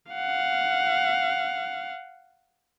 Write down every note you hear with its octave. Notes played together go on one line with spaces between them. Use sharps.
F5 F#5